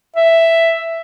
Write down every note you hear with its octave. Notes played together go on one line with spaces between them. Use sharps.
E5